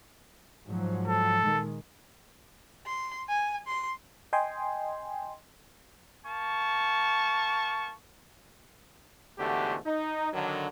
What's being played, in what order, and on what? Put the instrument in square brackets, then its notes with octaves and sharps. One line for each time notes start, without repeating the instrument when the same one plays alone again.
[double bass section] G#2 F3 F#3
[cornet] A4
[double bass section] A#2 D#3 G#3
[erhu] C6
G#5
C6
[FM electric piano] D#5 G5 G#5 C6
[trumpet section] A#3 A5 C#6
[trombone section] E2 G#2 D3 A3 F#4 G4
D#4
D3 D#3 F#3